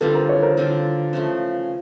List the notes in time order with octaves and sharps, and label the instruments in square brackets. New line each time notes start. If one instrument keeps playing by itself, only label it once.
[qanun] D3 G3 C4 F4 [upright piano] A4 B4
[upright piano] A#4 C5
B4 C#5
A#4 C5
[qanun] D3 G3 C4 F4
C#3 F3 A3